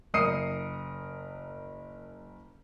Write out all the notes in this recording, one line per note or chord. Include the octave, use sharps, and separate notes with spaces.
F#1 A#4 D#6 C7 C#7 D#7